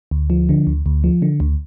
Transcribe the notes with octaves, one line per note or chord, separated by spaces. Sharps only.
D2
F3
D3
D2
D2
F3
D3
D2